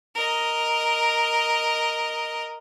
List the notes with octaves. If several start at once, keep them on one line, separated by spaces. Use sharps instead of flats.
A#4 D#5